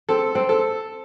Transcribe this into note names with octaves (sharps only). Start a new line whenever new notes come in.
C4 A4
C4
A4